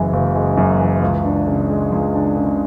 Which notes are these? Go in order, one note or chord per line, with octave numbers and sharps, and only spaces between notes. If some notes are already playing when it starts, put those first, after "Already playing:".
Already playing: F#1 F#2 E3 G#3
F#1
G#3
F#2
E3
C#2
D4
C#3
G#3
C#2
D4
C#3